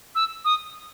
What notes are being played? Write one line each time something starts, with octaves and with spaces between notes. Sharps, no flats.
E6
D#6